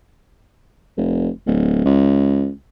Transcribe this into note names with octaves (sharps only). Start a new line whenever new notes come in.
F1
D1
C#2